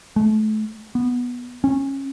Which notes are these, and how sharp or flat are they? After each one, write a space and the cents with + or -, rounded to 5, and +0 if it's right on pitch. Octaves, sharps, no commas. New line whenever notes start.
A3 -30
B3 -10
C#4 -20